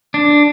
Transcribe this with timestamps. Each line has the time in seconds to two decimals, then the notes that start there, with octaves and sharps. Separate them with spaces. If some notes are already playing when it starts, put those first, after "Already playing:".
0.14 D4